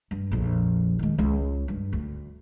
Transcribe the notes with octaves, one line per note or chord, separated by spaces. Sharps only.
G2
A#1 F2
D#3 G#3
C#2
G2
D2